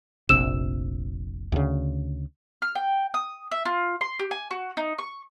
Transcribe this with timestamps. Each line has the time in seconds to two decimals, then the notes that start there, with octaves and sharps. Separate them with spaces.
0.29 F1 A#1 C3 E6 E7
1.52 D2 C#3
2.62 F6
2.75 G5
3.14 D#6
3.51 E5
3.65 F4
4.01 C6
4.19 G4
4.31 G#5
4.51 F#4
4.77 D#4
4.98 C#6